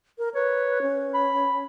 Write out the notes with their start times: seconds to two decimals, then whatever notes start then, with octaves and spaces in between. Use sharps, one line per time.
0.18 A#4
0.34 B4 C#5
0.82 C#4
1.14 B5